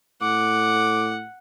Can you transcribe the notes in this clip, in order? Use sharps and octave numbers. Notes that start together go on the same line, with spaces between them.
A2 F#5 D6